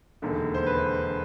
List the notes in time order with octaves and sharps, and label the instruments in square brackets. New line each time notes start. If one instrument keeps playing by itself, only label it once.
[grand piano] E1 D#2 D3
C5
B4